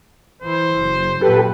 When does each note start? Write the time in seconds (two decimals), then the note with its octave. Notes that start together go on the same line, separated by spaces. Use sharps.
0.42 E3 E4 C5
0.75 F#1
1.21 F#2 A#2 G4 A4 B4